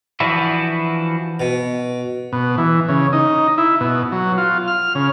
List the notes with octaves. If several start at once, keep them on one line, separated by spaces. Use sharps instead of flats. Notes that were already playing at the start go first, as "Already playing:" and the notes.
E3 F3 D4 E4 F#4
B2
B2
E3
C#3
D#4
E4
B2
F#3
F4
F6
C#3